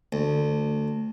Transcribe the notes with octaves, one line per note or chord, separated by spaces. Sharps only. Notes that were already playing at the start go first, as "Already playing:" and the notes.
D2